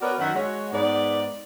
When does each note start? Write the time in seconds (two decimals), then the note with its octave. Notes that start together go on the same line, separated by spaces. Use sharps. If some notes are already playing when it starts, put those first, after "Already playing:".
0.01 B3 F#4 A#4 B4 C#5 D5
0.19 F#2 D#3 E5 F#5
0.34 G#3 F#4 C#5
0.72 G#2 B3 D5